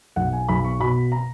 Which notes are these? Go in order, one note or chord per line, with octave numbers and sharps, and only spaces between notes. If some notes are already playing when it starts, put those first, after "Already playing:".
B1 F#5
G#5
B1 B5
C#6
B2 B5
A#5